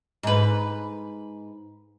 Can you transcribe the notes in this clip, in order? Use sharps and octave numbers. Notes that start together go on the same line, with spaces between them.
G#2 B4